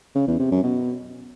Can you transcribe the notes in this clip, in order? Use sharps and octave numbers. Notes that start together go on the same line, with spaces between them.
C#3
E2
C3
F#2
B2